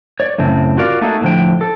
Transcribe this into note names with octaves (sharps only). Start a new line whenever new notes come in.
C#5 D5
F#2 A2 C#3 C4
F4 F#4 A#4 D5 F5
A3 A#3 D#4 F#4 G#4 A4
A2 D3 F3 G5
A4